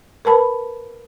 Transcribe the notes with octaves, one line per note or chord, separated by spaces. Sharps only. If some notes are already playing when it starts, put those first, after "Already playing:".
A#4 B4 A5 B5